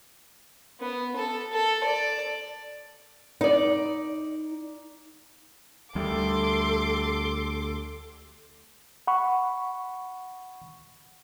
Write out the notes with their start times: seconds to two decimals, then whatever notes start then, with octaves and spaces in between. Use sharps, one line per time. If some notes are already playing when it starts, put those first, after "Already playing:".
0.80 B3
1.16 A4
1.52 A4
1.84 D5
3.41 D#4 D5
5.95 D2 G3 A4 C6 D6
9.07 F#5 B5 C#6